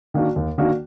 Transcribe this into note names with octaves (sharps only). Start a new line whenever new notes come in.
D#3 A#3 D4 F#4
D#2
D#3 A#3 D4 F#4